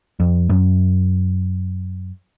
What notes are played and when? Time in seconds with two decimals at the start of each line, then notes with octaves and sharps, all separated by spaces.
0.20 F2
0.50 F#2